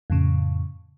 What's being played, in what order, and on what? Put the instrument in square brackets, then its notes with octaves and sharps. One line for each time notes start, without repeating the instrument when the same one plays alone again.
[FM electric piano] F2 A2 C#3